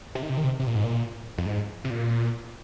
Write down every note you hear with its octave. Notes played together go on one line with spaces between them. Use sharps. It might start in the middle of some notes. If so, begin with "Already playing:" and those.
C3
D#3
C3
D#3
C3
C3
A#2
G#2
A#2
F2
G#2
C3
A#2